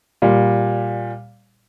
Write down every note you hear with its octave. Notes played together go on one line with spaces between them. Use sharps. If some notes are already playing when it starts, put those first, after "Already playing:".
A#2 G3